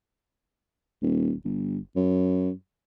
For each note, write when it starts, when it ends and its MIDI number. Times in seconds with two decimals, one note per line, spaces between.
1.02 1.35 27
1.44 1.79 31
1.96 2.51 42